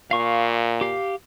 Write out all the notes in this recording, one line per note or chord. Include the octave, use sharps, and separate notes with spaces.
A#2 F5 C#6
G4 F5